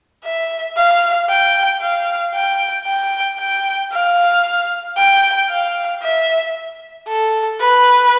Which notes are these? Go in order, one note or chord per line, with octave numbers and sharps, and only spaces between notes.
E5
F5
G5
F5
G5
G5
G5
F5
G5
F5
E5
A4
B4